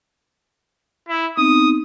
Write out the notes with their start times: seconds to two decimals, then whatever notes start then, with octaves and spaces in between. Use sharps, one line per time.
1.09 E4
1.37 B3 C4 D#4 D#6